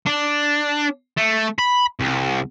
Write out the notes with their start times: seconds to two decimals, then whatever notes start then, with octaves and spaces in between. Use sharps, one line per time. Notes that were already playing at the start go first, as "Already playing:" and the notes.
0.06 D4
1.17 A3
1.59 B5
2.00 C2